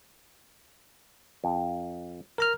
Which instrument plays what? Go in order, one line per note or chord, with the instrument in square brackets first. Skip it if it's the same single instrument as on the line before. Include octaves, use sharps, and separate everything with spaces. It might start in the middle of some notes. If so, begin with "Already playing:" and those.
[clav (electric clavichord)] F2
[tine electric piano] A#4 A#5 F6